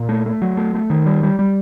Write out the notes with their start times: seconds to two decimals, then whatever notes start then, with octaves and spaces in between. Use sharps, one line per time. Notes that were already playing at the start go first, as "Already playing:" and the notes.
Already playing: A#2
0.09 A3
0.26 A3
0.42 F#3
0.57 A3
0.75 A3
0.90 D#3
1.06 G3
1.23 G3
1.39 G3